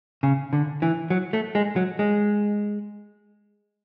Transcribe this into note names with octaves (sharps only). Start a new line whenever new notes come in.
C#3
D3
E3
F#3
A3
G#3
F#3
G#3